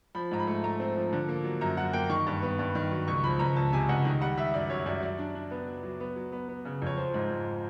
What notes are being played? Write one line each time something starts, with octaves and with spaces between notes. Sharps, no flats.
F3 B5
G#2 A#5
B5
A3
A3 A#5
C4
F3
D3
A#3
F#3
F#2 A#5
F#3 F#5
A#3 G5
D#3 C#6
G2
B3
G2
D#3
F#3
C#2 C#6
F3 B5
C#2 A#5
C#2 A5
C3 G#5
C#2 F#5
D#3
G3 F#5
G3 E5
F#2 D5
F#2 C#5
F#2 D5
F#3 D5
D4
D4
B3
F#3
F#3
B3
F#3
B3
B3
C#3
F2 C#5
F3 C5
G#2
G#2